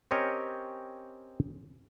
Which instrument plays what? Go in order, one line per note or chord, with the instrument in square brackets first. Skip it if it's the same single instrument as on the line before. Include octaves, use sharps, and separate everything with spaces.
[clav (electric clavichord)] C4 C#4 G4 A#4 C#5 D#5